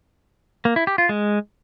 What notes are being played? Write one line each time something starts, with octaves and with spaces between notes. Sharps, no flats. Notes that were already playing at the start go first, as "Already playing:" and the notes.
A#3
E4
G4
F4
G#3